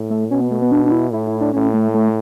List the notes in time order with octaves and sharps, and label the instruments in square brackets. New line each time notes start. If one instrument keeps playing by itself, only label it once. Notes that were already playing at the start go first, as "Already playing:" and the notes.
Already playing: [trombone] A2
[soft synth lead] A3
[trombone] B2 [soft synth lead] C#4
[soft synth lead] B3
A3
B3
D4
D4
E4
[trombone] A2 [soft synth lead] E4
[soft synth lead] E4
D4
[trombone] A2 [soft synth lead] C#4
[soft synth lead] A3
A3